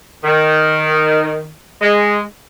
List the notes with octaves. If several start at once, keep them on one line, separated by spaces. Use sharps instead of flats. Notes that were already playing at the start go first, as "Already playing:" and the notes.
D#3
G#3